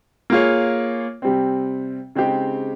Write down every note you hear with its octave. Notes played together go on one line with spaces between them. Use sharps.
A#3 F4 G#4 C#5
C3 G3 C4
C#3 G#3 C4 D#4 G4